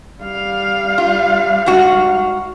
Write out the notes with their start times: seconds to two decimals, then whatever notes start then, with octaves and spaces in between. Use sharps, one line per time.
0.23 G3 F5
0.98 F4
1.66 G#2 F#4